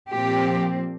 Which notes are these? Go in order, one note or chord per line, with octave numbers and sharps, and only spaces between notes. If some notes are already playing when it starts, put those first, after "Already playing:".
A#2 F3 C4 G4